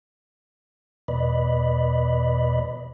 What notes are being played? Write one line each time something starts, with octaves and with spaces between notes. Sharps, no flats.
E2 B2 B4 D5 D#5 B5